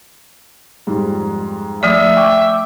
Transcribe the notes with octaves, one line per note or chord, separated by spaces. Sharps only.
F2 G#2 G3
F3 A3 D5 E5
G5 C#6 D6